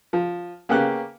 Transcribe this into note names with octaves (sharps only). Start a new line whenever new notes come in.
F3
C#3 A#3 B3 G4 F#6